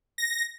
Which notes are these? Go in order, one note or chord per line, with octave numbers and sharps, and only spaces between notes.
A#6